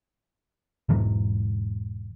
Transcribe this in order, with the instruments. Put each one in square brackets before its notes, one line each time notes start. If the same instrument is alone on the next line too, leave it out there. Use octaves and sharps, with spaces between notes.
[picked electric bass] E1 G#2 E3 F#3